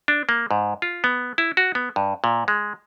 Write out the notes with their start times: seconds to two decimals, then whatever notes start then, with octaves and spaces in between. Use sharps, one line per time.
0.08 D4
0.29 A#3
0.51 G#2
0.82 F4
1.04 B3
1.38 E4
1.57 F#4
1.75 B3
1.96 G2
2.24 A#2
2.48 G#3